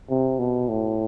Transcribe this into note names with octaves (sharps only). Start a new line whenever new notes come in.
C3
B2
A2